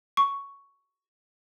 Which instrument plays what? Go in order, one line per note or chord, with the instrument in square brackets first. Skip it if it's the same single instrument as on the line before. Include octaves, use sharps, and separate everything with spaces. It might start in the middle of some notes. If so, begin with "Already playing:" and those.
[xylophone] C#6